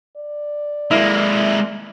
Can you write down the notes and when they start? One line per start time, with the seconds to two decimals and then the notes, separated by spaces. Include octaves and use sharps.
0.17 D5
0.91 G#3 A#3 E4